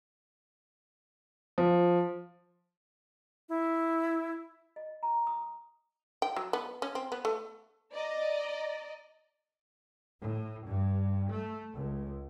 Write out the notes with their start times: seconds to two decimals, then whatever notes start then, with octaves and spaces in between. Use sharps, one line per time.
1.58 F3
3.49 E4
4.76 D#5
5.03 A#5
5.27 D#6
6.22 G5
6.36 F#3
6.53 B3
6.82 C#4
6.95 C4
7.12 B3
7.25 A3
7.94 D5 D#5 A#5
10.22 A2
10.67 G2
11.30 A3
11.73 C#2